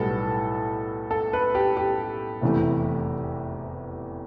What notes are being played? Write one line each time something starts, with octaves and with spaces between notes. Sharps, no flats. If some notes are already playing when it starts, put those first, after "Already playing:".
Already playing: B1 A2 G3 B3 A4
A4
B4
G4
G4
F1 E2 C3 E3 A3